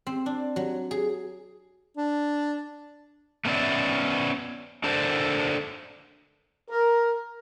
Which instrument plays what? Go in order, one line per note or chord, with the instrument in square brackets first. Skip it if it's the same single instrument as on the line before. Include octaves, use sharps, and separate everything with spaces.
[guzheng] C4
D4
F#3
G#4
[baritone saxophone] D4
[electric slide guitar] A3 B3 C#4 A4 D5 E5
D4 A4 A#4 C5 D5
[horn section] A#4